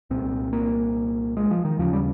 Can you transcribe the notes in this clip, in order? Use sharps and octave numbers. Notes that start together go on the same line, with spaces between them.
C2 A#2 C4
A#3
G#3
F3
D#3
D#2 C#3 F3
G3